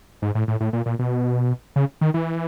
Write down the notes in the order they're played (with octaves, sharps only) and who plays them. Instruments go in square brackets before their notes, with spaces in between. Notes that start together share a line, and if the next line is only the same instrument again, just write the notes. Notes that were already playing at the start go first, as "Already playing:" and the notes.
[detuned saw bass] G#2
A2
A2
A2
A#2
A#2
B2
C#3
D#3
E3